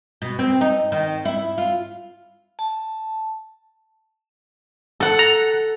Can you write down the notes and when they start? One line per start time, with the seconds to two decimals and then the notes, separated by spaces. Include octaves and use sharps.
0.22 B2
0.39 C4
0.61 D#4
0.92 D#3
1.25 E4
1.58 F4
2.59 A5
5.00 A4 F#5
5.19 A#5